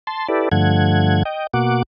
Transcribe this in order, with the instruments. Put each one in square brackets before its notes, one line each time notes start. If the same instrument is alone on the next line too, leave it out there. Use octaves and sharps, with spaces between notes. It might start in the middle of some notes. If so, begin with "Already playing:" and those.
[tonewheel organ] A5 C6
E4 G4 A4 B4 D5
G2 D3 F3 A3 F#5 G#6
D#5 G5
B2 A#3 F#4 F#5 D6